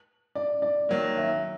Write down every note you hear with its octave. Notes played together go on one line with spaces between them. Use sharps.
D5
D5
D#3 F#3 A#3
E5